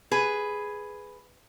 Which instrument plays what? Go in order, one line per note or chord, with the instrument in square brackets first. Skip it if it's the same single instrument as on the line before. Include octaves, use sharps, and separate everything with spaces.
[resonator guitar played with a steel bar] G#4 B4